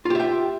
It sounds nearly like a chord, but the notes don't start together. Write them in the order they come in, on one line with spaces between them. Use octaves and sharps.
F4 G4 E5 G5